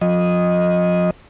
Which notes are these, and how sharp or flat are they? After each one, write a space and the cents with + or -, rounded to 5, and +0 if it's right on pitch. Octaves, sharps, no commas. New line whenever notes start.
F3 +30 D#5 +0